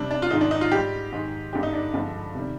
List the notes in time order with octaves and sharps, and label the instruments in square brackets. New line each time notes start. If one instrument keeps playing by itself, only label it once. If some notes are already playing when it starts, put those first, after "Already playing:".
Already playing: [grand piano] C3 G3 D4
D4
F4
G#2 D#3 G#3 D#4
D4
D#4
F4
G#2 G3 G4
G#2 D#3 G#3
G2 D3 G#3 G4
D#4
D4
G2 D3 F3 G#3
C3 D#3 G3